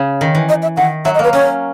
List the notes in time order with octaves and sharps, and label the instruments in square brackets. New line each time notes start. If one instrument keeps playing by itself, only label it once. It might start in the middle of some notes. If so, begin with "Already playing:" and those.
Already playing: [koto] C#3
D#3
E3
[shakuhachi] D#5
E5
[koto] D#3 [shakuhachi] F#5
[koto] F#3 [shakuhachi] E5
[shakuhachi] D#5
[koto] A#3 [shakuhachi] B4
[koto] C#4 [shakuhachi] C#5